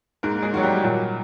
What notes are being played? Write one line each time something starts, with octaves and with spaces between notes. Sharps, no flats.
G#2 A#3 A#4
G#3 G#4
D#3 F#3 F#4
G3 G4
A#2 F#3 F#4